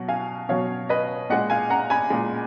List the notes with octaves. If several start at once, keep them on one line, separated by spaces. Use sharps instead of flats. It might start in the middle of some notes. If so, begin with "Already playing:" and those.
Already playing: B2 F#3 F#5
F5 G#5
B2 F#3 C#5 F5
B4 D#5
A#2 G#3 D#5 F#5
F5 G#5
F#5 A#5
G#5 B5
A#2 G#3